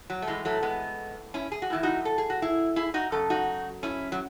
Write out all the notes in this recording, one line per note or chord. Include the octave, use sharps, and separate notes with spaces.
F#3
A3
A2 E3 G#3
F#3 A3
G#3 B3
C#4 E4
G#4
F#4
A2 E3 E4
D#4 F#4
A4
G#4
F#4
E4 G#4
E4 G#4
D#4 F#4
F#2 C#3 A4
D#4 F#4
C#4 E4
F#3